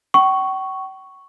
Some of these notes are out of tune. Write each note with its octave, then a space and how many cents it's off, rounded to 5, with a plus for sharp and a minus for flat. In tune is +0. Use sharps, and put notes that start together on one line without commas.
G5 -45 C#6 +0